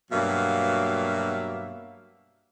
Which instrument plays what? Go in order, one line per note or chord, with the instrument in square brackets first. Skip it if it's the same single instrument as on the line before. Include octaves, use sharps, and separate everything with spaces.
[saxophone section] G2 B2 F#3 A#3 E5 F5